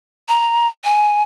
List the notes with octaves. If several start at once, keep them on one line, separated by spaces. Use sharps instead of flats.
A#5
G#5